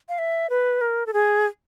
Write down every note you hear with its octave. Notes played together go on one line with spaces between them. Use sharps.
F5
E5
B4
A#4
A4
G#4